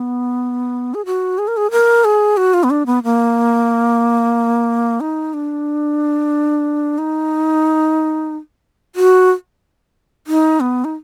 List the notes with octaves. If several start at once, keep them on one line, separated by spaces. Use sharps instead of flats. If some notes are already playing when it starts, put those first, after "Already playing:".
Already playing: B3
G#4
F#4
G#4
A#4
G#4
A#4
G#4
F#4
F4
B3
D4
B3
A#3
D#4
D4
D#4
F#4
D#4
B3
D#4